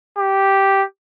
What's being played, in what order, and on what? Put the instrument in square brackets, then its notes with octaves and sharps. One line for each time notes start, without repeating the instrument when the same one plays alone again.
[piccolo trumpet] G4